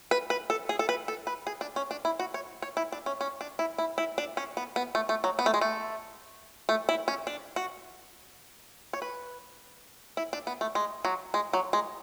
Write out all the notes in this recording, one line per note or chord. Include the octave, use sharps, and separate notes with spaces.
B4
B4
A4
G#4
A4
B4
A4
B4
G#4
D4
C#4
D4
E4
F#4
C#5
C#5
E4
D4
C#4
C#4
D4
E4
E4
E4
D4
C#4
B3
B3
A3
A3
F#3
B3
A3
G#3
A3
A3
E4
C#4
D4
F#4
C#5
B4
E4
D4
B3
A3
G#3
F#3
G#3
F#3
G#3